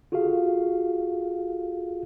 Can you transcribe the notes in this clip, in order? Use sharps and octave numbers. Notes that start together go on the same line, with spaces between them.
F4 F#4 G#4 A4 F5